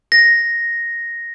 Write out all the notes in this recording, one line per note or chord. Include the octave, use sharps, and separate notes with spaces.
A#6